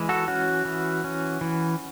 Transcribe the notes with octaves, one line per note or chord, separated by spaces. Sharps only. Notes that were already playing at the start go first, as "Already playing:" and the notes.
Already playing: E3 G#3
F#4 A4
C#4 F#4
E3
C#4
E3